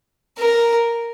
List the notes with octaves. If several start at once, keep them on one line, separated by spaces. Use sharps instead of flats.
A#4